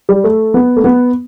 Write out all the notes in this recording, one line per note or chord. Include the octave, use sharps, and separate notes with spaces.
G3
A3
B3
A3
B3